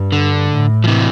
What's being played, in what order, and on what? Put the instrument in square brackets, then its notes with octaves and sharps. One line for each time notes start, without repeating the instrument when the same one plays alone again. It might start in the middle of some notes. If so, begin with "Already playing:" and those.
Already playing: [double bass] G2
[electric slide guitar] D3
[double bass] A2
[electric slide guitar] F3
C3 E3